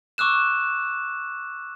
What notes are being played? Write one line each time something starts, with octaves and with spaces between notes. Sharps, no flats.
C#6 D6 E6 F#6 E7